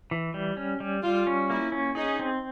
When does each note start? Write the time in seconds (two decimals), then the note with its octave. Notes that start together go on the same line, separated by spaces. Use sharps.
0.11 E3
0.34 G3
0.57 C#4
0.80 G3
1.03 G3 F4
1.27 C#4
1.50 A#3 E4
1.72 C#4
1.95 D#4 G#4
2.19 C4